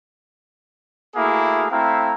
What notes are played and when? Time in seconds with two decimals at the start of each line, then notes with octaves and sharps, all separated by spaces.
1.16 A3 A#3 E4 F#4 G#4
1.71 A3 C4 E4 F5 A#5